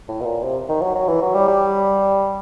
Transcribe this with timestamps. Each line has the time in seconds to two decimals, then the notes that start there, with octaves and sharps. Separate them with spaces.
0.08 A2
0.21 B2
0.25 A#2
0.43 C3
0.69 D#3
0.81 F#3
0.95 F#3
1.08 E3
1.22 F#3
1.35 G3
1.48 G3